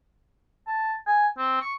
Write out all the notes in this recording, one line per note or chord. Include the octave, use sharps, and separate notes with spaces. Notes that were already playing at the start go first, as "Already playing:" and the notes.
A5
G#5
C4
C#6